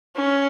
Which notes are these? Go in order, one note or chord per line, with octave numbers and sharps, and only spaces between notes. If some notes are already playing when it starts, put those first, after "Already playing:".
C#4